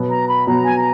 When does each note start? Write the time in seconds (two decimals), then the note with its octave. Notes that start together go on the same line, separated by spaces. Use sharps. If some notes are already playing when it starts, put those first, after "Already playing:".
Already playing: B2 F#3 B3
0.10 A#5
0.28 B5
0.47 B2 F#3 B3 A#5
0.64 G#5
0.76 A#5